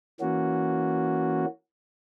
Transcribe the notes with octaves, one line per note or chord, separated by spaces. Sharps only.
E3 A#3 C#4 F#4